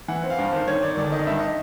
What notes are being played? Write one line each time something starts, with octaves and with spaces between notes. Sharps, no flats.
E3 F#5
C4
F5
G2
D#3 C5
D#3 C#5
D#3 D5
G1 D5
D#3 D#5
G2 E5
D#5